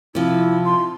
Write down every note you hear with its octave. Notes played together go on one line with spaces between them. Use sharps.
C3 F3 E4
C6